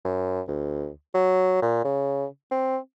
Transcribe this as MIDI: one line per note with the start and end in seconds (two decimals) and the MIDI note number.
0.05 0.41 42
0.48 0.90 38
1.14 1.62 54
1.62 1.82 46
1.85 2.25 49
2.51 2.78 60